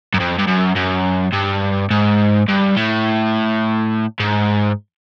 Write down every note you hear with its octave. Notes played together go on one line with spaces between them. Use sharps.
F#2
F2
G2
F#2
F#2
G2
G#2
G2
A2
G#2